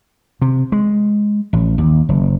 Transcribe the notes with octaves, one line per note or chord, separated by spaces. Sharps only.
C3
G#3
A1
D#2
F#1